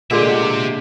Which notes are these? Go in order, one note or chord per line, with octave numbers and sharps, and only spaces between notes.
A#2 D3 G#3 G4 E5